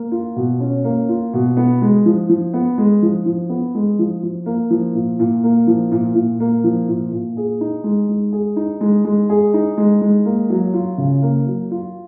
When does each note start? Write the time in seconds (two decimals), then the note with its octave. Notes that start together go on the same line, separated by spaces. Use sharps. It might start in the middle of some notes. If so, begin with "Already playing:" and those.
Already playing: A#3
0.12 F4
0.36 B2
0.60 C#4
0.84 A#3
1.09 F4
1.33 B2
1.57 B3
1.82 G#3
2.06 F3
2.29 F3
2.53 B3
2.78 G#3
3.02 F3
3.26 F3
3.49 B3
3.75 G#3
3.99 F3
4.23 F3
4.46 A#3
4.70 F3
4.95 A#2
5.19 A#2
5.44 A#3
5.67 F3
5.92 A#2
6.15 A#2
6.40 A#3
6.64 F3
6.89 A#2
7.12 A#2
7.37 G#4
7.61 D#4
7.84 G#3
8.09 G#3
8.32 G#4
8.56 D#4
8.81 G#3
9.05 G#3
9.29 G#4
9.54 D#4
9.78 G#3
10.01 G#3
10.25 A#3
10.50 F#3
10.74 F4
10.98 C#3
11.22 A#3
11.46 F#3
11.71 F4